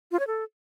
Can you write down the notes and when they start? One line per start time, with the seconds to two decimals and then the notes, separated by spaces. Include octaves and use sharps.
0.12 F4
0.19 C#5
0.27 A4